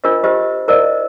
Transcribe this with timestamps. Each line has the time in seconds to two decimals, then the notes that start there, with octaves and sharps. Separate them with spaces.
0.04 D4 F4 A#4 C5 D#5
0.23 F4 G4 C5 D#5 E5
0.68 E4 A#4 C5 D5 D#5 F5